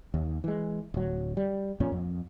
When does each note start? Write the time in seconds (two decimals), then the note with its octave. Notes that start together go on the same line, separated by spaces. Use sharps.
0.14 D#2
0.44 E3 G#3
0.94 D1 F#3
1.37 G3
1.80 F2 A#2 C#4
1.92 F2